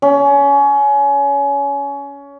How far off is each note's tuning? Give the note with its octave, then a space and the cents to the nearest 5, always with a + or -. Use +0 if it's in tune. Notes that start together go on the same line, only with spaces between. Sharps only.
C#4 +25